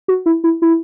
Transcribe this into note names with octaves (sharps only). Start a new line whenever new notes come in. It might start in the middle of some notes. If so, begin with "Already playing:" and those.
F#4
E4
E4
E4